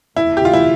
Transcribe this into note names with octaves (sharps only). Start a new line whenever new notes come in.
F1 E2 D3 A3 E4
G4
F4
E4